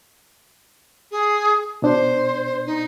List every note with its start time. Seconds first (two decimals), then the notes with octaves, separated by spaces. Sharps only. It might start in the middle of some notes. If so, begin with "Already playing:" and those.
1.11 G#4
1.82 B2 D4 C5
2.66 D#4